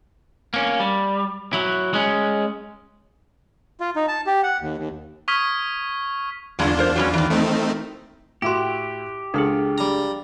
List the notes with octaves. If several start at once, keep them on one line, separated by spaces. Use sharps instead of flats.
A#3 C#4
G3
F#3 E4
G#3 C#4
F4
D#4
A5
G4
F#5
D#2
D#2
C#6 D#6 F6 G#6 B6
E2 G2 D3 G#3 D4 F4
G#3 A#4 C5
F#3 G3 C#4
D#3 E3
A3 C4 D#4
A2 E4 F#4 G4 C6 D6
C#2 D4 G#4 A4 F6
G3 A#5